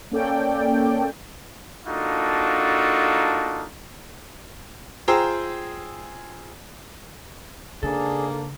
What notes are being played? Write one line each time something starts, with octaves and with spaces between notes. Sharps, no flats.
A#3 C#4 A4 D5 G5
A#3 D4 D#4 F4 F#4 A4
F4 G#4 C5 G5 A#5 E6
G#2 C#3 A#3 D4 G#4 A4